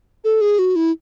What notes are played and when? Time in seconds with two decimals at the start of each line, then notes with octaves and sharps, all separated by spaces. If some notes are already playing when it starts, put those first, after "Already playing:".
0.24 A4
0.41 G#4
0.59 F#4
0.76 E4